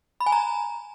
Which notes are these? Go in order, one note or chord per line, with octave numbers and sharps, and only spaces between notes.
B5
G#5
A#5